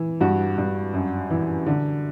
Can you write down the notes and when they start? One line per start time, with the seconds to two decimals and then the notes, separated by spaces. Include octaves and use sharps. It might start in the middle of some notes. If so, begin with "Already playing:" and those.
Already playing: E3
0.21 G2 F#4
0.58 G2
0.93 F#2
1.30 E3
1.66 D3